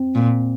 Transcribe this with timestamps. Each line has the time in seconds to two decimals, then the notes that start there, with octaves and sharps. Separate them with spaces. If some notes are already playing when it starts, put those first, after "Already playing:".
Already playing: C4
0.15 A#2